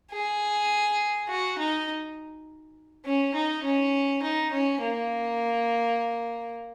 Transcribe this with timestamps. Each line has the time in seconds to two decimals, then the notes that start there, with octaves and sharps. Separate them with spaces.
0.12 G#4
1.29 F#4
1.59 D#4
3.05 C#4
3.34 D#4
3.64 C#4
4.22 D#4
4.52 C#4
4.82 A#3